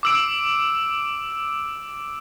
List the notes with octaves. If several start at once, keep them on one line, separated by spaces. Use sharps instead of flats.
D6 E6 D7